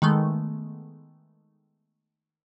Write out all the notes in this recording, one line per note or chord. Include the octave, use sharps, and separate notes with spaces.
D#3 G#3 A3 B3